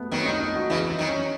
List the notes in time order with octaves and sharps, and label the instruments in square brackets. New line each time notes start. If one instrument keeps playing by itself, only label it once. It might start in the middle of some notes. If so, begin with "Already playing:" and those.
Already playing: [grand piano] A3 B3
[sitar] D#3 F#3 [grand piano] B3
[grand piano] D#4
D#4
F#4
[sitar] C#3 E3 [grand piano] E4
[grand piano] D#4
[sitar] D#3 F#3
[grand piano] C#4